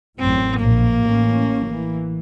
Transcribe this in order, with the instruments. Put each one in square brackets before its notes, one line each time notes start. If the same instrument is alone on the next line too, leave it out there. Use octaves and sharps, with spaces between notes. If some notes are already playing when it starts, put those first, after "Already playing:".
[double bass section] A1 F#2 A2 [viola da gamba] C4
[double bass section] A#1 [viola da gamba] A#3
[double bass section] A1 C#4
E3